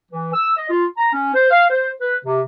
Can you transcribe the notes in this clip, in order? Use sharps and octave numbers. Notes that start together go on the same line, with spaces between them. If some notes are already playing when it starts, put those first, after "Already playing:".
E3
E6
D#5
F4
A#5
C#4
C5
F5
C5
B4
C3